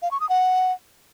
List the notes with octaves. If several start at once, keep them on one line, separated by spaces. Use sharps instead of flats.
F5
C#6
D#6
F#5